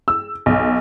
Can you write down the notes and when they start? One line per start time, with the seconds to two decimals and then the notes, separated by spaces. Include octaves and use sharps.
0.08 E6
0.46 B1